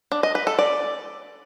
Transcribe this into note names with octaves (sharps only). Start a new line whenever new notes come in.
D4
D#5
B4
A4
D5